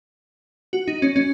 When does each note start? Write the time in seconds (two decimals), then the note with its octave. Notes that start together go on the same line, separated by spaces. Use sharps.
0.73 F#4
0.88 D#4
1.02 C#4
1.16 C#4